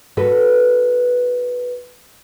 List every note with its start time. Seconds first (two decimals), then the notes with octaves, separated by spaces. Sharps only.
0.17 F#4 A4 B4